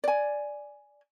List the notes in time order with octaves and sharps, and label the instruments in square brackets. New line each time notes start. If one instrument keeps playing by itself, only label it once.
[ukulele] D5 G#5